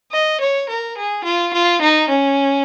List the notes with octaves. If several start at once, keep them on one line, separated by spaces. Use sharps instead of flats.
D#5
C#5
A#4
G#4
F4
F4
D#4
C#4